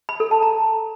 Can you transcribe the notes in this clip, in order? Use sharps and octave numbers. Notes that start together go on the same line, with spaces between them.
B5
A4
A5
A#5